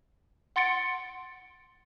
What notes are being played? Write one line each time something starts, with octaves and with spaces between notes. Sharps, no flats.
F#5 C6 A6 C#7 D7